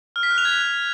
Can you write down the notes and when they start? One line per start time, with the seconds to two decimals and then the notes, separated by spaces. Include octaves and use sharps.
0.16 F6
0.23 B6
0.30 F#6
0.38 F7
0.45 G#6